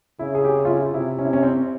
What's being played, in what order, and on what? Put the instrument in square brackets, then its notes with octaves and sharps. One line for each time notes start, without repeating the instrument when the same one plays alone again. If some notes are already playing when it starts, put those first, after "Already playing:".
[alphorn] C#3 [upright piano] E4
[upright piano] G#4
G4
F4
E4
[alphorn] C3 [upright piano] E4
[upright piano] C#4
E4
C#4
C4